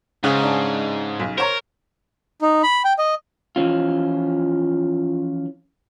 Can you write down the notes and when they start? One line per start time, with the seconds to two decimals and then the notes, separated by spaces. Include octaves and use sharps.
0.24 G#2 C#3
0.44 D4
1.20 B1
1.38 A#4 C5 C#5 A#5
2.42 D#4
2.63 B5
2.85 G5
2.99 D#5
3.56 E3 F3 C#4 F4